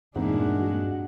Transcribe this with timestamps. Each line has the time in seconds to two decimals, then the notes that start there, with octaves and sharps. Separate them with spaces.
0.16 E2 G2 A#2 G#3 C4 D4 D#4 F#5
0.60 F#4